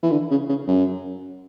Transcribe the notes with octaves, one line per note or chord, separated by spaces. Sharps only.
E3
D3
C#3
C#3
F#2